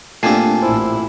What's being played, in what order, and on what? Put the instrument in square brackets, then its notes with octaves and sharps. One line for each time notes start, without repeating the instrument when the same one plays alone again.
[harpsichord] A#2 C4 G4 [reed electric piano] A3 D4 [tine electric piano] G#5 A5 C7
[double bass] A1 E4 [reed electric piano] C5